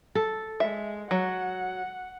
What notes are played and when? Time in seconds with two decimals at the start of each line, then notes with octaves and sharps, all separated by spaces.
0.15 A4
0.60 G#3 E5
1.11 F#3 F#5